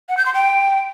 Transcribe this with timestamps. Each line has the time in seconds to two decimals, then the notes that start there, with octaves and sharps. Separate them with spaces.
0.09 F#5
0.17 G6
0.26 C6
0.34 G5